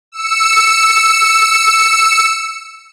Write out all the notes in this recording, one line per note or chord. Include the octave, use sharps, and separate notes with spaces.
E6 C#7